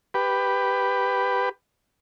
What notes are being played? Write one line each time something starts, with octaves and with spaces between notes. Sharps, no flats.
G4 B4